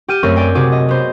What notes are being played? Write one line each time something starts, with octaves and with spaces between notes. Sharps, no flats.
G4 G5 F6 D#7
F#2 A3 C4 A#4 C#6
D5 G5 G#5
C3 F#4 G#4 D6
D#5
B3 C5